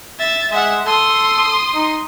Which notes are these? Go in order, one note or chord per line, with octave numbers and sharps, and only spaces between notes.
E5 A6
G#3 E5 F#5
A4 C6 D#6
D#4